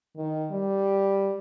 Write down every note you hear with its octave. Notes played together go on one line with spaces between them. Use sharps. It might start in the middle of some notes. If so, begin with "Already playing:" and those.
D#3
G3